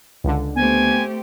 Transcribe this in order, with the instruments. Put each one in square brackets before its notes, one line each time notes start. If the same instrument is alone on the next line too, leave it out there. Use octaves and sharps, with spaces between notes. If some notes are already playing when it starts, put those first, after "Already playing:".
[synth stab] C#2 D3
[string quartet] A3 C4 G4 [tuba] B3 [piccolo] G#5